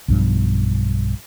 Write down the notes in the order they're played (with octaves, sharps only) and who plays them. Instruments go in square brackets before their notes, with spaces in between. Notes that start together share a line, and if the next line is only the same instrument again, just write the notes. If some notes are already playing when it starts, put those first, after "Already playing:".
[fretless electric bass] B1 G2 F3